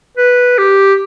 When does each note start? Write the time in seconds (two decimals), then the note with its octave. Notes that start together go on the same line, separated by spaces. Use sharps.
0.17 B4
0.58 G4